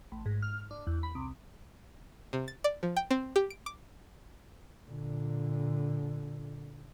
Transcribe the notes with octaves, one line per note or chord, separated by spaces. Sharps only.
A1
G#2
F6
D4
E2
B5
C2
C3
A6
D5
F3
G5
C4
G4
D7
D6
A#2 D3